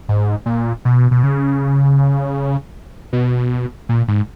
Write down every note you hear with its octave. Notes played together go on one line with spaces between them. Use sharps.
G#2
A#2
B2
B2
C#3
B2
A#2
G#2